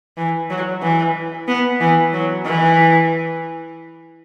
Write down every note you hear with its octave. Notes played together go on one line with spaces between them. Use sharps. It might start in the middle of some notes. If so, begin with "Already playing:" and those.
E3
F#3
E3
B3
E3
F#3
E3